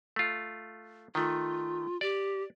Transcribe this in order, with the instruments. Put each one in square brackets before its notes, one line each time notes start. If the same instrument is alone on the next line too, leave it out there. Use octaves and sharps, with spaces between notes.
[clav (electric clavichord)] A3 F4
[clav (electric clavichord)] D#3 A3 [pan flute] F4
[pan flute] G4 [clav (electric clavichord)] D5